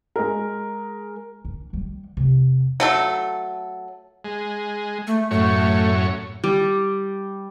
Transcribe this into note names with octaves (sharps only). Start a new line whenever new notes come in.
G#3 A#4
D4
D#3 G3
E2 C3
F#3 A3 A4
G#3
A3
F#2 A2 A3 C#5
G3